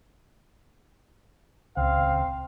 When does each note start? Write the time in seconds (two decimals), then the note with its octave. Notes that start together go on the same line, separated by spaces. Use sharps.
1.77 D#1 C#2 C4 F5